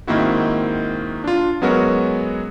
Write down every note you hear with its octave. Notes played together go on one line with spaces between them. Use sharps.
G#2 D#3 A#3 C4 E4 F#4
D4 F4
F#3 G#3 B3 C#4 F#4 A#4